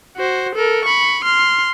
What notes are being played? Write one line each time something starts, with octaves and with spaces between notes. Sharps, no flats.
F#4 C5
A4 A#4
B5 C#6
C6 F6